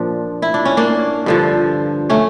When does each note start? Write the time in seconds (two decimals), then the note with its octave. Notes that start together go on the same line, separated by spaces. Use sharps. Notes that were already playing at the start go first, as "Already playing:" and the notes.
Already playing: A#2 F3 D4
0.42 E4
0.54 D4
0.65 C#4
0.77 A#3 D4
1.26 G2 D3 F3
2.10 A3 C#4